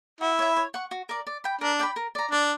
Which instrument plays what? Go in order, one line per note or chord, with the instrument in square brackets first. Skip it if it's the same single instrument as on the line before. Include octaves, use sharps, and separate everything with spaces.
[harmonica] E4 [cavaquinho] F#4
[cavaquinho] C#5 E5
C#5
F#5 C#6
F#4
A#4 D5
D5
G5 B5
[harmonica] D4 [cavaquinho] A#4
[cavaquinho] D5 G5 B5
A#4
D5 A#5
[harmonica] D4 [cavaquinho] D5